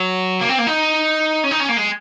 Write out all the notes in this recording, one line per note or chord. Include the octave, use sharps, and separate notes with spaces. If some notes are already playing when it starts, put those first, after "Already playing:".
Already playing: F#3
A#3
C4
A#3
D#4
C#4
D#4
C#4
A#3
G#3